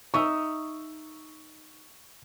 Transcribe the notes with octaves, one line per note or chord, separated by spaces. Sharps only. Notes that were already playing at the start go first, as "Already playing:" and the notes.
D#4 E5 C#6 E6